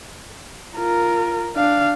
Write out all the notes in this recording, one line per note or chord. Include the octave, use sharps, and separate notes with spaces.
F4 A#4
D4 F5